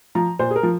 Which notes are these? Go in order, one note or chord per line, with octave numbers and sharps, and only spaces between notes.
F3 A#5
A#2 C5
G#4
A#4
F3